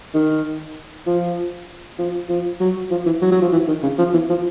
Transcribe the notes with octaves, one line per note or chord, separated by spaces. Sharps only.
D#3
F3
F3
F3
F#3
F3
E3
F#3
F#3
F3
E3
D#3
C#3
F3
E3
F3